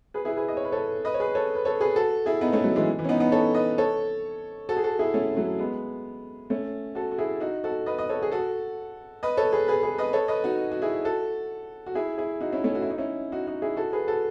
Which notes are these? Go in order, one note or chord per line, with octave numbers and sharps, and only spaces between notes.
G#4 B4
E4 G#4
G#4 B4
D#5
C#5
B4
A4 C#5
B4 D#5
C#5
G#4 B4
A4 C#5
B4
A4 C#5
G#4 B4
F#4 A4
E4 G#4
B3 D#4
A3 C#4
F#3 A3
E3 G#3
E3
C#4
B3 D#4
B3 D#4
A4 C#5
B4 D#5
A4 C#5
F#4 A4
G#4
F#4 A4
E4 G#4
A3 C#4
F#3 A3
G#3 B3
A3 C#4
F#4 A4
F#4
E4 G#4
D#4 F#4
F#4 A4
B4 D#5
D#5
A4 C#5
G#4
F#4 A4
B4 D#5
A4 C#5
G#4 B4
G#4 B4
G#4 B4
B4 D#5
A4 C#5
B4 D#5
D#4 F#4
F#4
E4 G#4
F#4 A4
F#4
E4 G#4
E4 G#4
D#4 F#4
C#4 E4
A3 C#4
F#4
E4
D#4
C#4 E4
D#4 F#4
D#4 F#4
E4 G#4
F#4 A4
G#4 B4
F#4 A4